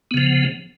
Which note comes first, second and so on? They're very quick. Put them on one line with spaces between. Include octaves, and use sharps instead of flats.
B3 C#3 F3